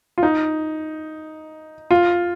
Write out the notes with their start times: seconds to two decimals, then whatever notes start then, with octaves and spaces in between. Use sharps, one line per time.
0.18 F4
0.23 D#4
1.91 F4